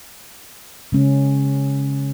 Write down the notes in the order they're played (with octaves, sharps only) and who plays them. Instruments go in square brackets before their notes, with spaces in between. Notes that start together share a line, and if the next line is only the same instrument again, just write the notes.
[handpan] C#3 G#3 C#4